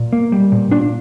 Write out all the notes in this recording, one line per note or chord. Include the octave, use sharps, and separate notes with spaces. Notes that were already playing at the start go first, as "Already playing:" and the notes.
Already playing: A#2
A#3
G3
A#2
A#2 D4